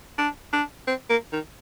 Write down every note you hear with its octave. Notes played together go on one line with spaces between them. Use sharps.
D4
D4
C4
A#3
D#3